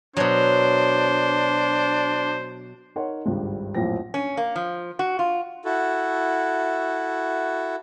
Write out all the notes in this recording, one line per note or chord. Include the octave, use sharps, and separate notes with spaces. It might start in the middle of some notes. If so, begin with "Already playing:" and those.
B2 F#3 D4 C5
D#4 A#4 C#5 F#5 C6
G#1 C#2 G2 G3
A1 F2 A#2 F#3 C4 A#6
C#4
A#3
F3
F#4
F4
E4 F#4 A4